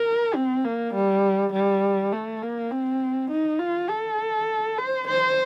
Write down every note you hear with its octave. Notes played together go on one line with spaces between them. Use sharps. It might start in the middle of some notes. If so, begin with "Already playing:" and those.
Already playing: A#4
C4
A#3
G3
G3
A3
A#3
C4
D#4
F4
A4
C5
C5